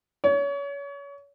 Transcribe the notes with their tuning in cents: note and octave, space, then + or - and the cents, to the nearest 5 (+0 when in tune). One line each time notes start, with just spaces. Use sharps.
C#5 +30